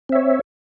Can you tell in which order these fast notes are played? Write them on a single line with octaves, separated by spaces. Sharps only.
C4 E5 C#5